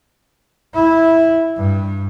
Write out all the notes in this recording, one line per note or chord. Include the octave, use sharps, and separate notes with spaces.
E4
G2